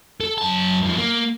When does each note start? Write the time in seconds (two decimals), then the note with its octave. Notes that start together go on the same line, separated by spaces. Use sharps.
0.21 A4
0.38 F#2 A5
0.82 G2 F3
0.97 A#3